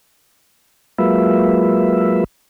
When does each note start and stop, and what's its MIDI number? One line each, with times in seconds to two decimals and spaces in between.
0.99 2.24 54
0.99 2.24 56
0.99 2.24 58
0.99 2.24 65
0.99 2.24 71
0.99 2.24 76